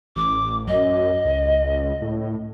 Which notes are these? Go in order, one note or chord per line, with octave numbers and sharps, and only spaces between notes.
A1 D6
F#2 D#5
C#2
A2